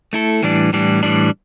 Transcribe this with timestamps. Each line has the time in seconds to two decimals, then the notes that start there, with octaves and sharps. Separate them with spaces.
0.13 A3 E4 A4
0.43 A2 E3 G3 D4
0.73 A2 E3 G3 D4
1.03 A2 E3 G3 D4